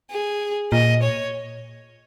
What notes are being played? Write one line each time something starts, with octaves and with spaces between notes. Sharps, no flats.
G#4
A#2 D#5
C#5